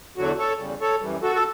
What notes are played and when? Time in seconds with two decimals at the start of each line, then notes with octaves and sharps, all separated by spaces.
0.17 E2 D3 F#3 F#4
0.39 A4 C#5
0.60 E2 C#3 G3
0.81 A4 C#5
1.02 F#2 E3 G3
1.22 F#4 A4
1.35 A4